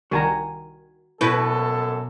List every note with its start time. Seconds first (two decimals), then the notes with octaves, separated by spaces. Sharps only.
0.11 C2 D#3 F#4 G#5 A#5
1.21 A#1 F#2 B2 E4 A4 B4